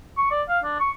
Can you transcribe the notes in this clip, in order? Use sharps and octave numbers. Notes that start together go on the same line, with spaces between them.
C#6
D5
F5
D4
C#6